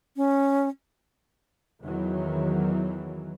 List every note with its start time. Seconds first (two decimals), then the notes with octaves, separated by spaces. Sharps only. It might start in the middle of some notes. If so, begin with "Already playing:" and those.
0.17 C#4
1.82 E2 D#3 E3 F#3